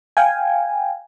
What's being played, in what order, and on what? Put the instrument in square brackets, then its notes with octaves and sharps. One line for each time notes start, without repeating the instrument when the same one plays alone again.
[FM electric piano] F5 G5 G#5